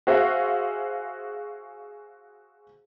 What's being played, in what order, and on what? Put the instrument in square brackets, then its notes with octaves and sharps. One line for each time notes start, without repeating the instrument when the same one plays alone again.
[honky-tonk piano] F#4 G#4 C5 E5 F5